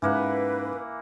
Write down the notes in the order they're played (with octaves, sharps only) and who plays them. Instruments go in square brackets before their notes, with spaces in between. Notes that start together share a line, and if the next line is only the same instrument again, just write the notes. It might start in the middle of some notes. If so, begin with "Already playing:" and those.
[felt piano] G#2 C#4 [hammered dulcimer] E3 A#3 F#5 [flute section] B4